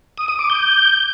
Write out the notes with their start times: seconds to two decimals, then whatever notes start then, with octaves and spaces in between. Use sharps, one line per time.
0.18 D#6
0.28 D#6
0.39 D6
0.50 G6